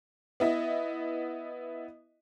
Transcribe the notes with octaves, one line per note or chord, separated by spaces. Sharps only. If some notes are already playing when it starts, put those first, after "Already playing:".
B3 E4 D#5